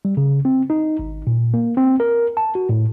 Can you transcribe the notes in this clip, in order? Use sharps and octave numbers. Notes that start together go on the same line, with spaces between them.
G3
C#3
C4
D#4
G#1
A#2
A#3
C4
A#4
A5
F#4
A2